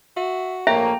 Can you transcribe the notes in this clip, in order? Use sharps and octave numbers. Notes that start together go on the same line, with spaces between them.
F#4 E5
A#1 A3 A#3 C#5 E5 G5 A#5